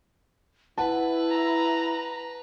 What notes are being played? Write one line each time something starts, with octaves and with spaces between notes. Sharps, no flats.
E4 B4 F#5 A5
A#5